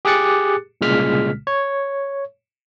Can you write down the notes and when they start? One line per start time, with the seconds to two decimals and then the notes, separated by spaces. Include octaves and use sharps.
0.05 G4 G#4 D6 F#6 A6 C#7
0.81 C2 A#2 C#3 G#3 F6 B6
1.47 C#5